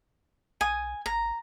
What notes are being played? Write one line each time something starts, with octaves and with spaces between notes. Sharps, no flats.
B1 G#5 D#6
G#1 A#5